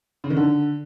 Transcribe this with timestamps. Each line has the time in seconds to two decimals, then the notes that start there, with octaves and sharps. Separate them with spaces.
0.24 C#3
0.30 D#3
0.37 D3